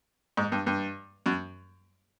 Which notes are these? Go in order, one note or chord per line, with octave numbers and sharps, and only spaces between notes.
G#2
G2
G2
F#2